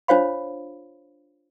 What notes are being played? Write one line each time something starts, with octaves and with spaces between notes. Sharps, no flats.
D4 F4 C5 C#5 F5 B5